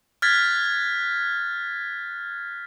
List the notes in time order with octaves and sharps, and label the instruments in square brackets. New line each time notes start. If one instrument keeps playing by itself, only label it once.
[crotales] F6 F#6 G#6 A6 B6